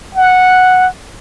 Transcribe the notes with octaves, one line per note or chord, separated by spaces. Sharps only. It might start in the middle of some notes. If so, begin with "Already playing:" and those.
F#5